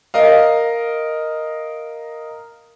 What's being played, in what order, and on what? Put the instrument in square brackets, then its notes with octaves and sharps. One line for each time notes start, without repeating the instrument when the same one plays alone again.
[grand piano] A#4 D#5 F5